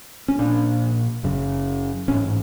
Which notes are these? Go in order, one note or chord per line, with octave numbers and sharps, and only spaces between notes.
C#4
A#1 A#2 D4
F#1 F#2 C#3
A1 G#2 C#4